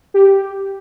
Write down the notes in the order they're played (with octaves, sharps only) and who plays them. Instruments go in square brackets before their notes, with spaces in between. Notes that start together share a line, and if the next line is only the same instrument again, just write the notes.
[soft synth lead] G4